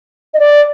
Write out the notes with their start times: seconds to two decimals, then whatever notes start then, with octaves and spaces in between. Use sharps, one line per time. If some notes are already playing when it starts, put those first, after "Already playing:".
0.34 D#5
0.39 D5